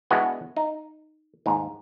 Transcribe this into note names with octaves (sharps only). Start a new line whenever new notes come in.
G#3 B3 D4 E4 F#4 G#4
D#4
D#2 G#2